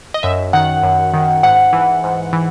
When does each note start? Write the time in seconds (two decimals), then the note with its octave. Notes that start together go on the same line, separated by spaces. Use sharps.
0.14 D#5
0.23 F#2 E5
0.53 D#3 F#5
0.83 F#2
1.14 D#3
1.43 G#2 F#5
1.73 E3
2.04 G#2
2.33 E3